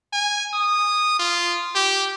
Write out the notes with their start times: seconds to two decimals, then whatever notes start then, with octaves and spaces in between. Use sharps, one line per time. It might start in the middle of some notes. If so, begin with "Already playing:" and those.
0.13 G#5
0.53 D#6
1.19 F4
1.75 G4